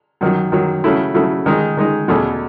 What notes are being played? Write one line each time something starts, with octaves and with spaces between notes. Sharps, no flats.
F#2 D#3 F#3
F#2 D#3 F#3
C#3 F#3 A3 E4
C#3 F#3 A3 E4
D#3 G#3 D#4
D#3 G#3 D#4
E2 B2 A3 C#4 G#4